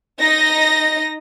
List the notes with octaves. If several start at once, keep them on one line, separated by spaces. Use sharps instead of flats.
D#4 D#5 A#6